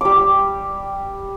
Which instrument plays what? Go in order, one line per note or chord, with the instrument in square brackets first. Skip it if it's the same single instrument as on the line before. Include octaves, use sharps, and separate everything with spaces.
[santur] G3 D6